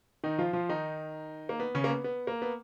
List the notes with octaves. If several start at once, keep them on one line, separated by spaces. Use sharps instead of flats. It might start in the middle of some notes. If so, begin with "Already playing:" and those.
D#3 D#4
F3 F4
F3 F4
D#3 D#4
A#3
B3
C#3 C#4
A#3
B3
B3
A#3
B3